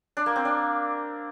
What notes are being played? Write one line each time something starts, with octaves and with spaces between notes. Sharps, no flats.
D4
A#3
C4
D4